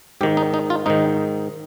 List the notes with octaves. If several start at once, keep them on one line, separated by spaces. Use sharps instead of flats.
G#2 D#3 G4
D#4
D#4
F4
G#2 D#3 D#4